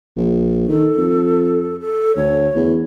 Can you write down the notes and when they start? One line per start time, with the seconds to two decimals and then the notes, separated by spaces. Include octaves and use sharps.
0.16 A#1
0.68 D#3 A4
0.97 F2
1.80 A4
2.16 D2 C#5
2.55 E2